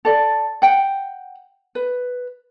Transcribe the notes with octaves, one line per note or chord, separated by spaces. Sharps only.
A4 D5
F#5 G5
B4